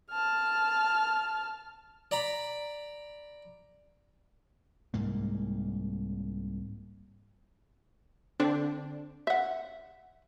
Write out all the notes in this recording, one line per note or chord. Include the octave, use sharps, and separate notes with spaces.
A5 F6
D5 A#5 B5
C2 G#2 A#3
D3 C4 D4
E5 F#5